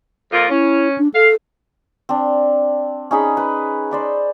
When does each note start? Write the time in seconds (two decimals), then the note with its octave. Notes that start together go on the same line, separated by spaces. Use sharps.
0.32 F2 A#3 F4
0.49 C#4 E4
0.98 D4
1.14 A4 F5
2.09 C4 D4
3.11 C#4 D#4 G#4 B5
3.37 B4
3.91 C5 D5 B5